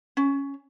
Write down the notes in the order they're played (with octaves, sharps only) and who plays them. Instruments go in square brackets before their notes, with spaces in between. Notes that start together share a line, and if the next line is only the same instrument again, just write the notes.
[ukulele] C#4